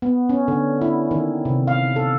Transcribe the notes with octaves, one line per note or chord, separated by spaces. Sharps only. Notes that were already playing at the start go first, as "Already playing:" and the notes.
B3
C#4
D3
E4
D#3
C3
F5
A4